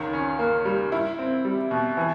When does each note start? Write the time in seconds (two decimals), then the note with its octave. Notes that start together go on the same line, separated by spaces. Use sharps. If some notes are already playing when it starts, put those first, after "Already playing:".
Already playing: C#2 D#3
0.13 C#4
0.39 A#3
0.65 G3
0.92 E4
1.19 C4
1.45 G3
1.71 B2
1.97 E3